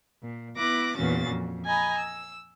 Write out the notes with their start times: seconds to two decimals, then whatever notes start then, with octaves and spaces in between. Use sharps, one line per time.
0.23 A#2
0.57 B3 E4 D6 F#6 A#6
0.95 E2 A#2 E3 C#4 F#4 A6
1.29 F2
1.65 D#5 G#5 A#5 B5
1.97 E6